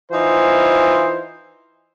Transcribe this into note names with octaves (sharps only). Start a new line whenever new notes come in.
E3 D#4 F4 C5